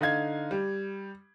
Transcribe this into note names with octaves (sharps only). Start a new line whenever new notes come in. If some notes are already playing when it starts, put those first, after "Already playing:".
D3 D#4 F5 G#6
G3